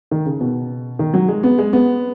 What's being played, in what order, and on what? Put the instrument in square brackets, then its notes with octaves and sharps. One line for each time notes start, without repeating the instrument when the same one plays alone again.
[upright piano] D#3
C#3
B2
D#3
F#3
G#3
B3
G#3
B3